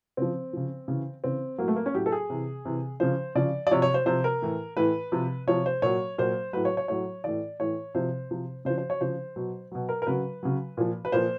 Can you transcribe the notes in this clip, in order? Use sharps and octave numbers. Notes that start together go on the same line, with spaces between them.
C#3 F3 C4
C#3 F3
C#3 E3
C#3 E3 C4
A2 F#3 A#3
A3
A#3
C#4
A2 F#3 G4
A4
G#4
C3 E3
C3 E3
C#3 F3 C5
C#3 F3 D5
D5
C3 F3 C#5
C#5
C5
C3 F3 C5
A#4
A2 E3
A2 E3 B4
C3 F3
C3 F3 C#5
C5
A#2 F#3 C#5
A#2 F#3 C5
A2 F#3 B4
C#5
C#5
A2 F#3 C#5
A2 E3 D5
A2 E3 C#5
C3 F3 C5
C3 F3
C#3 F3 C5
C5
C#5
C#3 F3 C5
B2 F#3
B2 F#3
A#4
A#4
C#3 F#3 B4
C#3 F#3
A#2 F3
B4
A#2 F3 C5